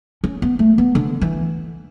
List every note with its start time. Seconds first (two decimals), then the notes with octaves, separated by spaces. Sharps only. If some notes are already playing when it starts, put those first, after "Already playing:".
0.24 C#4
0.42 B3
0.59 A3
0.78 B3
0.95 D3
1.21 E3